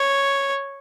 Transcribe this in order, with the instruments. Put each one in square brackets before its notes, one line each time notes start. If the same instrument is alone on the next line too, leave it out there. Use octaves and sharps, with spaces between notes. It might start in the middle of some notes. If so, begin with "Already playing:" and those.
Already playing: [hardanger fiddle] C#5